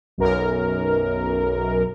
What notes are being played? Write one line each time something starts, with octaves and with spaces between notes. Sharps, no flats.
B1 F#2 A#4